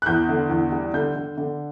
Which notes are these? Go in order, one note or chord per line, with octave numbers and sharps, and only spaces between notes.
F#6
E2 G6
D3
E2
G3
D3 G6
D3
D3